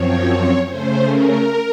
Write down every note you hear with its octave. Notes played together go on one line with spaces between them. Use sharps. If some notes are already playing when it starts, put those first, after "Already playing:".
Already playing: F#2 F3 C4 C#5
C#3 A3 C#4 C5
A#4